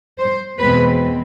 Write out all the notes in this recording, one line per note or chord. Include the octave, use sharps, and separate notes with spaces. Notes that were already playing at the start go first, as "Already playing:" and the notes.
C5
E2 B2 G#3 C4 B4